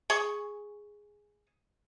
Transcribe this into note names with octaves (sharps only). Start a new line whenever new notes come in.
G#4 C#6